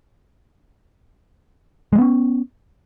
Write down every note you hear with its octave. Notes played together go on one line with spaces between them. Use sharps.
G3 G#3 B3 C#4